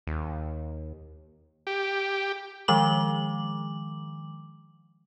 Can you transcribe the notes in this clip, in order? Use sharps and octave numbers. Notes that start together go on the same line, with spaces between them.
D#2
G4
D#3 F3 G#3 D6 F#7